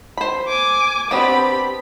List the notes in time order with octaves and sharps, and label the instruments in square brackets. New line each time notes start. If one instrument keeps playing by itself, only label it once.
[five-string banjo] C5 B5
[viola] G#5 D6
[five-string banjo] B3 C4 D4 [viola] G4 B5